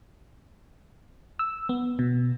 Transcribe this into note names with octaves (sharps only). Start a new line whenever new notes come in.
E6
B3
B2